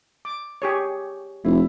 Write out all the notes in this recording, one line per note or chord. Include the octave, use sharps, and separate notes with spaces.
D6
G4 G#4 C#5
F1 E4